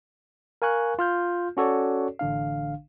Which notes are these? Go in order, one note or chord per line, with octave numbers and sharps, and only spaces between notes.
A#4 F5 G#5 C#6 F#6
F4 F6 G6
C#4 F#4 A4 C#5 D5
A1 D3 D4 F5